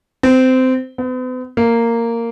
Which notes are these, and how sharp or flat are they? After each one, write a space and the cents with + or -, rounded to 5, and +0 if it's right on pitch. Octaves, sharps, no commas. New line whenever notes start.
C4 -20
B3 +45
A#3 -10